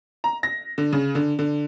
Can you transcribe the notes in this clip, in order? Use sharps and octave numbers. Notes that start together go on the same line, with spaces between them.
A#5
A#6
D3
C#3
D3
D3